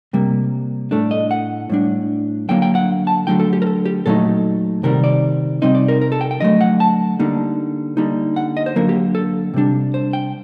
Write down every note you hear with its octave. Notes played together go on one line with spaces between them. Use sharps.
C3 G3 A#3
A2 A3 D4 A4
D#5
F#5
A2 G3 D4
D3 F#3 A#3 G5
G5
F#5
A5
D3 F#3 A3 D#4 G5
A4
G4
A#4
A4
G4
A#2 F#3 A3 D#4 A4
C3 D#3 G3 A#4
D5
C3 G3 C4 D#4 D#5
D5
A#4
A#4
A4
G5
G5
D3 F#3 A3 D#5
F#5
A5
D3 G3 A#3 D#4
D3 G3 A#3 D#4
F#5
D#5
C5
D3 F#3 A#3 A#4
G4
A4
C3 G3 D4
C5
G5